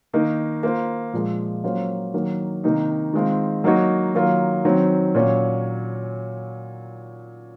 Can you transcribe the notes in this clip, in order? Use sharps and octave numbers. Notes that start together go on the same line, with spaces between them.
D#3 A#3 D#4
A#3 F4 C5
A#2 F3 G#3
F#3 A#3 C#4 F4 C5
D#3 F#3 A#3
C3 D#3 A#3 D#4
D#3 G#3 C4 F4
F#3 A#3 D#4 F#4 C#5
D#3 F#3 A#3 F4
D#3 F#3 C4
A#2 F#3 C#4